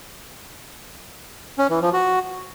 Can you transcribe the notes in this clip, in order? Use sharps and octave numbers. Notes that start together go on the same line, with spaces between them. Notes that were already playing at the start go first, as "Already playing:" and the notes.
C#4
E3
F3
F#4